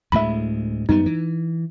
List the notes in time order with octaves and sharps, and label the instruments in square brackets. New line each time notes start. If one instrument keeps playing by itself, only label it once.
[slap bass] D2 A2 G#3 [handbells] E5 B5
[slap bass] F#2 G3 B3 [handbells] D#4
[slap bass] E3